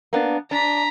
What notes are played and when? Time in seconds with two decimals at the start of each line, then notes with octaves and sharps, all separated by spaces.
0.13 A#3 B3 D4
0.51 D4 A#5 B6